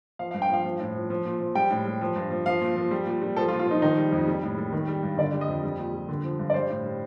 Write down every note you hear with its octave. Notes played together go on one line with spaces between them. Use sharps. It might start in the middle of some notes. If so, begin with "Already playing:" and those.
F3 F5
F5
G2
G5
F3 F5
F3
A2
F3
F3
A#2
F3
G3 G5
A2
G3
F3
G2
F3
F3 F5
A#2
F3
G3
A#2
G3
F3 A4
F4
A#2
F4
F3 D#4
D#3 D#4
G3
F2
G3
A2
G3
D#3
G3
G2
D3 D5
G3
D#5
F2
G3
A#2
G3
D3
F3
G2
D5
G3 C5
A2
G3